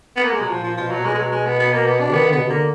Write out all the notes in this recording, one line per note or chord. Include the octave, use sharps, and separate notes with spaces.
B3
A#3
G#3
B2 F#3
A#2 F3
F3
B2 F3
F#3
A#2
B2 G#3
G#3
F#3
G#3
B3
B3
A#3
B3
D4
D#3 B3
D3
B2 B3
D3 A#3